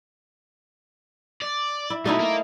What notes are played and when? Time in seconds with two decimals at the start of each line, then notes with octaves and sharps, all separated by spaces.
1.42 D5
1.90 E4
2.06 B2 A3 D#4 E4
2.20 A#3 A#4